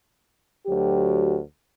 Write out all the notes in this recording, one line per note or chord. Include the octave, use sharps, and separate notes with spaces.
D2 F#3 G4